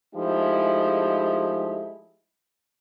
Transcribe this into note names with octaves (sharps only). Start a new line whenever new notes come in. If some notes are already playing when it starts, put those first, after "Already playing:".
F3 G#3 A3 D#4 E4 G4